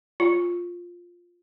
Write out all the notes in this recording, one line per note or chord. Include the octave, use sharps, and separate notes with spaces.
F4